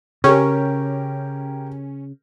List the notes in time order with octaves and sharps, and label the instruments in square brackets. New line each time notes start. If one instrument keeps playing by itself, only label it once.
[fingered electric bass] C#3 [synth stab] C#4 [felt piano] G4 A#4